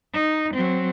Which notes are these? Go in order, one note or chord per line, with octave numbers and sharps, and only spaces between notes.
D#4
F#3 C4